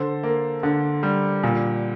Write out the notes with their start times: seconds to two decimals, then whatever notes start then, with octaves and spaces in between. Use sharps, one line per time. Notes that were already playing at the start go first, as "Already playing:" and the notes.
Already playing: D3 A4 C5
0.23 A#3
0.63 D3
1.03 G3
1.43 A#2